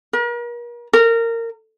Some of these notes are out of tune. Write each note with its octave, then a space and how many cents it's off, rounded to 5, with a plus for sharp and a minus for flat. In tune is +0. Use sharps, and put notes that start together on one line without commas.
A#4 +40
A#4 -20